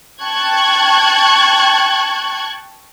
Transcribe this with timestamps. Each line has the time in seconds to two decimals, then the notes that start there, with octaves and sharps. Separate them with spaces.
0.22 G5 A5 C#6 F#6 G#6